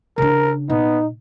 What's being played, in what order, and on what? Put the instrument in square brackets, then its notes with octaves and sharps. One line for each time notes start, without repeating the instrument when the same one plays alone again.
[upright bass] C#3 D4 [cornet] A#4
[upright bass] A#2 [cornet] B3 [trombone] D#4